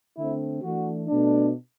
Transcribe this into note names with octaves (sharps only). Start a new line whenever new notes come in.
D3 A3 C4 E4
E3 A3 D4 F#4
B2 A3 D4